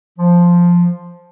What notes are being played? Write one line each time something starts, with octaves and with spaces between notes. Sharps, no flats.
F3